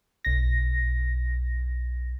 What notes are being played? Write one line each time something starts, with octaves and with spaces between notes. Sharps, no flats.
B1 A#6